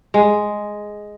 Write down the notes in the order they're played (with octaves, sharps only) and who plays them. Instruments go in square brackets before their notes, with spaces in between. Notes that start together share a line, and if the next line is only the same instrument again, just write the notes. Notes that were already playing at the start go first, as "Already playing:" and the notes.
[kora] G#3